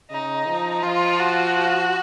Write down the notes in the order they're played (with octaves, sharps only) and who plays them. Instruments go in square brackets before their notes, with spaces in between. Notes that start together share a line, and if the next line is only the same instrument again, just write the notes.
[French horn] C#3 [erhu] D#4
[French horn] F3
[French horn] F3 [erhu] F4
[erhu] F#4